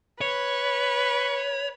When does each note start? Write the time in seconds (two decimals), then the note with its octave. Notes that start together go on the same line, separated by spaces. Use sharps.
0.21 B4 C#5